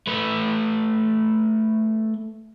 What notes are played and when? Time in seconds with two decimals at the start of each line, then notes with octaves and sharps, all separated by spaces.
0.07 A3 B4